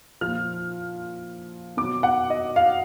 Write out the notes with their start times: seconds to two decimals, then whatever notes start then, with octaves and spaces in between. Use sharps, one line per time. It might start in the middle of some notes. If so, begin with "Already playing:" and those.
0.21 A#2 F3 F6
1.77 B2 F#3 D6
2.03 F#5
2.30 D#5
2.56 F5